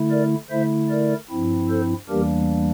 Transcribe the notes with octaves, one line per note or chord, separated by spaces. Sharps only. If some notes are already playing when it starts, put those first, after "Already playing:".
Already playing: D3 A3 E4
A#4 D5
D3 A3 E4 C5 E5
A#4 D5
G2 F3 C4 E4
A4 C5
E2 E3 G3 A#3 D4 G4 A#4